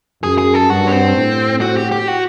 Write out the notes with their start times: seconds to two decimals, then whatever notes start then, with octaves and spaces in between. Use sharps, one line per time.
0.23 F#2 G#4
0.38 G#4
0.54 A4
0.70 G2 F#4
0.87 C#4
0.92 C4
1.16 A2
1.61 F#4
1.77 G4
1.92 G4
2.08 F#4